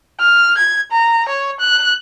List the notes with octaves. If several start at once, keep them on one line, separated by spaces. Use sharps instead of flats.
F6
G#6
A#5
C#5
F#6